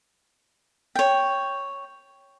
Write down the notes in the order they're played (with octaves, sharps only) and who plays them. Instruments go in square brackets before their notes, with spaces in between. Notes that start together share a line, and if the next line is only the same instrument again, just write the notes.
[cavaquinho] C#5 G5